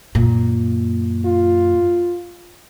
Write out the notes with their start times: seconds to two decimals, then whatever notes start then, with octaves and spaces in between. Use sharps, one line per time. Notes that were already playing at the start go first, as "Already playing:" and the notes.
0.15 F#2 A#2
1.26 F4